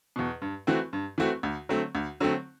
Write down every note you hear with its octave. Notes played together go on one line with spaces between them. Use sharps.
E2 B2
G2
E3 A3 C4 F#4
G2
E3 A3 C4 F#4
D2
D3 F#3 A3 C4
D2
D3 F#3 A3 C4